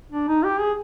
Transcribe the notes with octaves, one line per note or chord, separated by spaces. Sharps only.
D4
D#4
G4
G#4